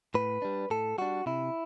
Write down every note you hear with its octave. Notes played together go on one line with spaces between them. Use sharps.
A2 B4
G3 D4
A2 A4
G3 D4 F#4
C3 E4